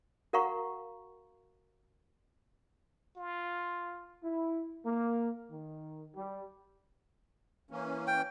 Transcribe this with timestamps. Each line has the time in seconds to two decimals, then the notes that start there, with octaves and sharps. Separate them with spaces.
0.33 F#4 A#4 F5 F#5 A#5 C#6
3.17 F4
4.23 E4
4.85 A#3
5.51 D#3
6.16 G3
7.71 E3 A#3 C#4
8.07 G5